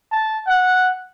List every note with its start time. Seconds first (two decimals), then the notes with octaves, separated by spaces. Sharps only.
0.11 A5
0.47 F#5